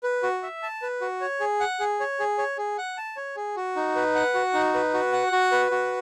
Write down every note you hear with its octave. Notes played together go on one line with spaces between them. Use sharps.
B4
F#4
E5
A5
B4
F#4
C#5
G#4
F#5
G#4
C#5
G#4
C#5
G#4
F#5
A5
C#5
G#4
F#4
D#4
B4
F#5
F#4
D#4
B4
F#4
F#5
F#4
B4
F#4